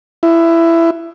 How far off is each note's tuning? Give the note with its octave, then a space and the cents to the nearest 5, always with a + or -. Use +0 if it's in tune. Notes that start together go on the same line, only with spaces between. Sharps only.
E4 +15